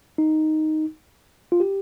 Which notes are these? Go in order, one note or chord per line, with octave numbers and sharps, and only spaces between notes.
D#4
F4
G4